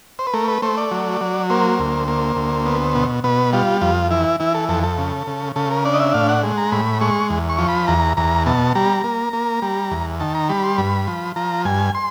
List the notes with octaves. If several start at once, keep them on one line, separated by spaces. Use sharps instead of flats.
C5
B4
A3 A#4
B4
A3 C5
D5
F#3
F#3
A#3 C5
D2
A#3
D2
B3
B2
B2 B4
G3 F4
F2 F4
E3 E4
E3 E4
A4
F2 A4
A4
C#3
C#3
C#3 A4
A#4
D4 D5
D#5
E5
A2 F5
F#5
G#3
A#5
A2 B5
G#3 C#6
E2
C#6
F3
B5
E2 A#5
E2 A#5
B2 A5
G3 A#5
A#3
A#3
G3
E2
D#3 A5
A#5
G3 B5
C6
G2 B5
F3
F3 A#5
G2 G#5
C6